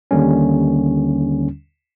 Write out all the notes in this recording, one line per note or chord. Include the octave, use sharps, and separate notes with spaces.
D#2 D3 G3 C#4